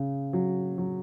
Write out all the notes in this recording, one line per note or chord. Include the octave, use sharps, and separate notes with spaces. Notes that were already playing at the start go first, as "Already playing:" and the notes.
Already playing: C#3
F#3
F#3